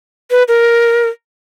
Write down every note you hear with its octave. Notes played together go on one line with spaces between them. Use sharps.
B4
A#4